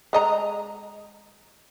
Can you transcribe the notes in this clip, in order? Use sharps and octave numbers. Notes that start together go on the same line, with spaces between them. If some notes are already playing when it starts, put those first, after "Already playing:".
G#3 D#5 A#5